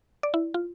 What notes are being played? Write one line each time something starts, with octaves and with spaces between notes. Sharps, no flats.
D5
E4
F4